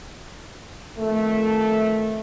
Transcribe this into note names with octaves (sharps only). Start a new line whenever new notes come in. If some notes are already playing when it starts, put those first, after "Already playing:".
F2 D#3 A3